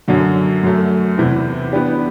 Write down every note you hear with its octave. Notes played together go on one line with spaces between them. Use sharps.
F#2 D3 F#3
F#2 F#3 A3
E2 C3 E3
E3 B3 D4 G4